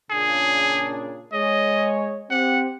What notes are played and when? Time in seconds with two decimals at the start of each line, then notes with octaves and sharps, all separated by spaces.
0.11 A#2 C#3 D4 G#4
1.33 G#3 C#5 D#5
2.31 C4 G4 F#5